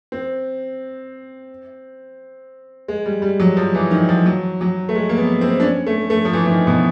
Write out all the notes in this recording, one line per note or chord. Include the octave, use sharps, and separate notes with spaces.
C4
G#3
G3
G3
F#3
F3
E3
D#3
F3
F#3
F#3
A3
G#3
A#3
B3
C4
D4
C#4
A3
A3
F3
E3
E3
D#3
B2